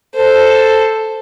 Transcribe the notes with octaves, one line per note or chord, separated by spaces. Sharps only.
A4 C5